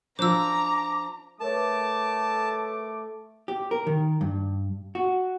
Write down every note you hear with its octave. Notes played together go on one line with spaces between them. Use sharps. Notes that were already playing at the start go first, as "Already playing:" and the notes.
F3 D4 C5 A#5 D6 E6
A3 A#4 B4 C#5 A5 D6
G4
A#4
D#3
G2
F#4